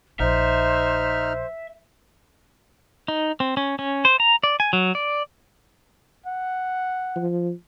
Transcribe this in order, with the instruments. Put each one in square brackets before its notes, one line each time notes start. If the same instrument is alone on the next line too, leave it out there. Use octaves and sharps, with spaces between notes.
[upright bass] A#1 [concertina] D#4 F6 [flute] C5 [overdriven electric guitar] E5
[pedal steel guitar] D#4
C4
C#4
C#4
C5
A#5
D5
G#5
F#3
D5
[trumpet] F#5
[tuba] F3